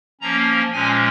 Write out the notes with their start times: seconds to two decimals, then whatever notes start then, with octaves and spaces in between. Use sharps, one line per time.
0.21 F3 A#3 C#4 A#5
0.72 A#2 F3 G#3 C#4 G#5